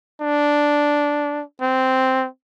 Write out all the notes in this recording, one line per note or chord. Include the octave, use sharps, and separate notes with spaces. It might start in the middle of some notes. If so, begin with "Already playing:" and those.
D4
C4